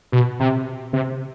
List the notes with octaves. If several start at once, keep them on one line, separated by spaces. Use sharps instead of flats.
B2
C3
C3